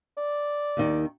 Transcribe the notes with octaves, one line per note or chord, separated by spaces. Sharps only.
D5
D#2 D#3